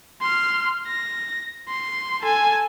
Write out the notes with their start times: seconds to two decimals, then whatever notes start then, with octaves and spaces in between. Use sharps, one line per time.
0.21 C6 F6
0.87 A#6
1.69 C6
2.21 A4 G#5